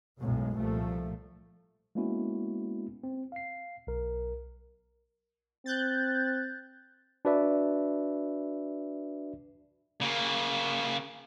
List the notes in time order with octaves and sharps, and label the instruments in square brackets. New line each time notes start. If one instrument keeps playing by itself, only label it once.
[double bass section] B1 F#2 A2 G#3
C2 A#2 F3 A3
[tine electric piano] G#3 A#3 B3 C#4 E4 F#4
C4
F5 C7
B1 A#4
[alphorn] C4 [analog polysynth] F#6 G6 A6
[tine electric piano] D4 F#4 B4 D5 E5
[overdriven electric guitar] C#3 A#3